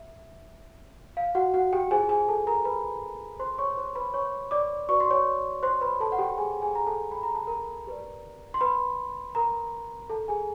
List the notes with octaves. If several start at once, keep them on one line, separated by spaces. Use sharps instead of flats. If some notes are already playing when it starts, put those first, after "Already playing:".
Already playing: E5
F5
F#4 F#5
F#4 F#5
G4 G5
F4 G#4 C5 G#5
G#4 G#5
A4 A5
A#4 A#5
B4 B5
C5 C6
C#5 C#6
C5 C6
B4 B5
C#5 C#6
D5 D6
F#4 B4 D5 C#6
C6
C#5 C#6
C5 C6
B4 B5
A4 A5
F#5
G4 G5
G#4 G#5
G#4 G#5
A#5
A4 A5
B5
A#5
A5
A#4 A#5
G4 B4 D5
C6
B4 B5
A#4 A#5
A4 A5
G#4 G#5